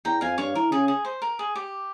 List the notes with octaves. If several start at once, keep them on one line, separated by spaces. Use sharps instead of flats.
E2 G5 A#5
F2 F5 G#5
G2 C#5 F5
E3 A#4
C#3 G#4
G#4
C5
A#4
G#4
G4